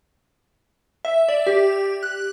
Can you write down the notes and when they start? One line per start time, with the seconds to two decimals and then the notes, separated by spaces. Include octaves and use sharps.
1.05 E5
1.28 D5
1.47 G4
2.03 F#6